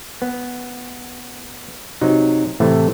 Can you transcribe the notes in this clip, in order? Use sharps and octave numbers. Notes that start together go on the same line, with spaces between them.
B3
C3 F#3 D#4
A2 C3 E3 A3